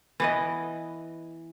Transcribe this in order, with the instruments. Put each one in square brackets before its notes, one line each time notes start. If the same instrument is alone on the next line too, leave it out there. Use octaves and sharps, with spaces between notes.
[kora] E3 B3 D#5